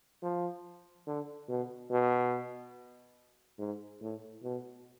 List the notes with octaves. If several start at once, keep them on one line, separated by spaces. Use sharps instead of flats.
F3
D3
B2
B2
G#2
A2
B2